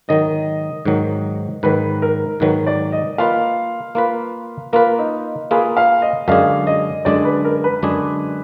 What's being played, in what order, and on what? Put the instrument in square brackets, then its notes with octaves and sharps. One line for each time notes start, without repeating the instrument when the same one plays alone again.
[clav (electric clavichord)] G#2 D#3 F#3 [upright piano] D#5
[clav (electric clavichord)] G#2 D#3 F#3
[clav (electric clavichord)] G#2 D#3 F#3 [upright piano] B4
[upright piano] A#4
[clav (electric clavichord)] G#2 D#3 F#3 [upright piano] B4
[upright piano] D5
D#5
[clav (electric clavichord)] A#3 F4 B4 [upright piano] F5
[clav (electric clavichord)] A#3 F4 B4
[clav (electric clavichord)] A#3 F4 B4 [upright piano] A#4
[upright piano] D#4
[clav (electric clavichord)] A#3 F4 B4 [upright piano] G#4
[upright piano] F5
D#5
[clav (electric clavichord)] F#2 D3 G#3 D4 G#4 [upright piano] F5
[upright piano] D#5
[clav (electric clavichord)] F#2 D3 G#3 D4 G#4 [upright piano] D5
[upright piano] B4
A#4
B4
[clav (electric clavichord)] F#2 D3 G#3 D4 G#4